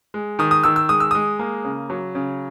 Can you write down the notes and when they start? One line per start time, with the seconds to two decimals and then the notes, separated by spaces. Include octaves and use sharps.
0.14 G#3
0.39 D#3 D#6
0.51 D#6
0.64 D#3 E6
0.76 E6
0.89 G#3 D#6
1.00 E6
1.11 G#3 D#6
1.39 A#3
1.65 C#3
1.90 F#3
2.15 C#3